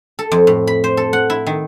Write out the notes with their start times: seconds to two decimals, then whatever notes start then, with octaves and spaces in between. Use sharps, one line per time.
0.19 A4
0.32 F2
0.47 A2
0.67 B5
0.84 C5
0.97 A4
1.13 F#5
1.30 E4
1.47 D#3